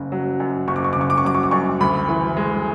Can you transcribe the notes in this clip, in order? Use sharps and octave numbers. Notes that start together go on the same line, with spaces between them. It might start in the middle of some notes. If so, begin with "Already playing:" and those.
Already playing: F#1 C#3
F#3
F#2
F#1 C#6
D6
C#6
D6
C#3 C#6
D6
C#6
F#3 D6
C#6
D6
F#2 C#6
D2 B5
E3
G#3